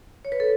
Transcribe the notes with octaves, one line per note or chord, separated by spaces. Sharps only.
C#5
B4
A4